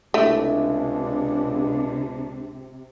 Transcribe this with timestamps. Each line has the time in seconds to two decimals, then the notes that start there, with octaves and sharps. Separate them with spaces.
0.14 C#2 C3 A3 D4 E4